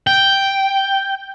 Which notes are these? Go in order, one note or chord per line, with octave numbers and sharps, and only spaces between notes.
G5